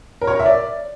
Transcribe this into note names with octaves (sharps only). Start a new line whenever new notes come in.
A#4
C#5
A#4
E5
D5